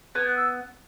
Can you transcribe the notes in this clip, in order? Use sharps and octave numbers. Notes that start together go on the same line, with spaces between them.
B3 G#6
F#6
E6